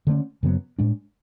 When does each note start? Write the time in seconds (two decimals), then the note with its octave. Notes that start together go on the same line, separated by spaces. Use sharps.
0.07 D3 A3 C#4
0.43 F#2 C#3 F#3 B3
0.79 A2 G#3 D4